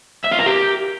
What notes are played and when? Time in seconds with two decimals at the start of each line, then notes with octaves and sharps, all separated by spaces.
0.25 E5
0.32 F4
0.39 A#4
0.46 G4